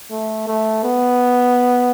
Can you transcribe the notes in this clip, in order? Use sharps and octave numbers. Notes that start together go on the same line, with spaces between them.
A3
A3
B3